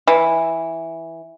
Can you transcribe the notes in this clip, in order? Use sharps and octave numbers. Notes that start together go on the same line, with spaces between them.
E3